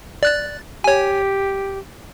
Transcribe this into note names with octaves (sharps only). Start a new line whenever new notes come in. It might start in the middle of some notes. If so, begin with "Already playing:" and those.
D5 F#6 A6
G4 C#5 G#5